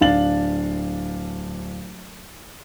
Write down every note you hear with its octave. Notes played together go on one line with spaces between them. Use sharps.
D1 D4 F5 A6 F#7